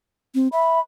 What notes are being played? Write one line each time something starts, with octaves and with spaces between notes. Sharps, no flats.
C4
E5 B5